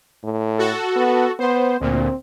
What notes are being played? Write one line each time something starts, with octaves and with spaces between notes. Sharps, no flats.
A2
F#4 A4
B3
B3 C5
D2 A#2 C4